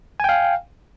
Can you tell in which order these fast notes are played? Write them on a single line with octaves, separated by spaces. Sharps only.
G#5 G5 F5